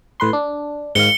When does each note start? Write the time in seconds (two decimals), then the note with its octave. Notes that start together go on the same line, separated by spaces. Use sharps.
0.20 A2 B4 C6
0.33 D4
0.95 G#2 D#3 F5 C#7 G7